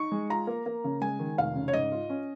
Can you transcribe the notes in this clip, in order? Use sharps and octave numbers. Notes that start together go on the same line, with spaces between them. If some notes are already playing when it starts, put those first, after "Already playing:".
Already playing: D#4 C#6
G#3
F4 A#5
A#3
A#3
C#3
G#3 G#5
D#3
F1 F5
C#3
C#5
G#2 D#5
F4
C#4